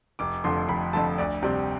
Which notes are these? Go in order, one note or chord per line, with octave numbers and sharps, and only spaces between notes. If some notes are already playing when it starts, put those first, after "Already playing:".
F1 D6
F2 D3 F3 A3 C6
F1 B5
F2 D3 F3 A3 A5
D2 D5
C3 G3 C4 D5